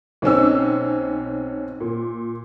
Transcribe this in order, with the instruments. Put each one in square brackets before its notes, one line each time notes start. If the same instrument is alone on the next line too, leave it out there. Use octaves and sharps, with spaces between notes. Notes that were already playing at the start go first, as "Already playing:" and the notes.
[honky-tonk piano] B1 C4 C#4 E6
A#2